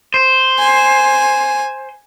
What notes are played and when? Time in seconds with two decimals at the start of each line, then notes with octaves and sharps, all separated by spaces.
0.14 C5
0.59 G#5